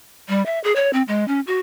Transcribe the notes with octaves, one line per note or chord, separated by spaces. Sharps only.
G3
E5
G#4
C#5
C4
G#3
C#4
F#4